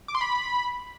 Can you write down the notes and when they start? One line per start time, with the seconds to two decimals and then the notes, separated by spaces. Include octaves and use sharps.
0.08 D6
0.15 C6
0.21 B5